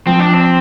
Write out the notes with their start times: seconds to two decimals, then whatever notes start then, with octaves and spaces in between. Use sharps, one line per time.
0.06 F3 C4
0.20 D4
0.34 C4